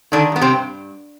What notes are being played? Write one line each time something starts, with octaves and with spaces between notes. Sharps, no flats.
D3 D#3 D4
G2 B3
C3 C4
G2